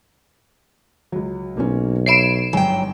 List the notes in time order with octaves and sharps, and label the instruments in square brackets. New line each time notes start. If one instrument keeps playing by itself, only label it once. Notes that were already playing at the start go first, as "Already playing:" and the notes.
[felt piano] C#2 F#3
[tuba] B1 [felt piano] A#3 C4 C#4
[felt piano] C#5 E5 B5 [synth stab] C7 D7 E7
[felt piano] G1 G#2 G#5 [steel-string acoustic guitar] F#3 G5